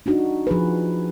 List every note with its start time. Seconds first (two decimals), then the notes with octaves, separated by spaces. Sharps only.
0.06 D4 D#4 F#4
0.47 F3 G#4 B4